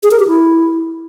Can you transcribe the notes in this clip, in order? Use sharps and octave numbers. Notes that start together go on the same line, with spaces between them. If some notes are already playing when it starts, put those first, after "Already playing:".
G#4
A#4
G4
E4